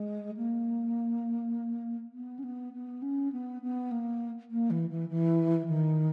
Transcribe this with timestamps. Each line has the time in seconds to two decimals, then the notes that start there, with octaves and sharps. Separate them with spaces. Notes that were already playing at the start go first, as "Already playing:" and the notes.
Already playing: G#3
0.37 A#3
2.14 B3
2.39 C#4
2.44 B3
2.73 B3
3.02 C#4
3.32 B3
3.62 B3
3.91 A#3
4.51 A#3
4.70 E3
4.90 E3
5.09 E3
5.68 D#3